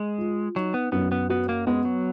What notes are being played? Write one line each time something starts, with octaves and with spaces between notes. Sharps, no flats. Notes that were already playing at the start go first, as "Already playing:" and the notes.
Already playing: G#3
F4
F#3 D#4
B3
F#2 B3
B3
B3 F#4
A#3
G#3 B3
F#3